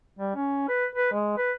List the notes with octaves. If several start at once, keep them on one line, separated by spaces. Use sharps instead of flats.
G3
C#4
B4
B4
G#3
B4